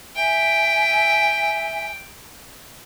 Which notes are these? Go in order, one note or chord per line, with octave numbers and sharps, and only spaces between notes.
E5 G5 G#5